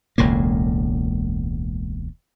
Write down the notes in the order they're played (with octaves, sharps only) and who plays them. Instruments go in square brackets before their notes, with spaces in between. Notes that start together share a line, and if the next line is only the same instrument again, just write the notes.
[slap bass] E1 C#2 A2 A#3